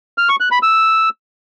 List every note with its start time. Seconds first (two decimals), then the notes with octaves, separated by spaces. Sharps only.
0.18 F6
0.29 C#6
0.40 F#6
0.52 B5
0.63 E6